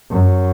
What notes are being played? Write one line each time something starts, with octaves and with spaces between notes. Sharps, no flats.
F#2